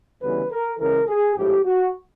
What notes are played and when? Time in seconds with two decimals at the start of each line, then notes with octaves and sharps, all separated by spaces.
0.22 D2 C#3 E3 G3 B3 B4
0.51 A#4
0.79 C#2 C#3 E3 A#4
1.07 G#4
1.36 A#1 A2 F3 G#3 G4
1.65 F#4